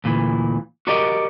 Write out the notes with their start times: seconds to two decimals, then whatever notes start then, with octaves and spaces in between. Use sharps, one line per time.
0.04 D2 A#2 D#3 E3
0.87 F#4 G4 A#4 D5 D#5